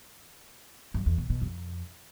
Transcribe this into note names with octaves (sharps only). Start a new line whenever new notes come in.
F#2
E2
B2
B2
F2